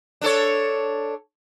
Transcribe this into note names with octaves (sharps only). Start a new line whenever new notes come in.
D4 A4 C#5